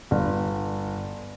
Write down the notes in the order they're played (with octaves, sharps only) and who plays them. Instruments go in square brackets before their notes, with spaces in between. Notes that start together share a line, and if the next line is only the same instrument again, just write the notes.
[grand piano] G1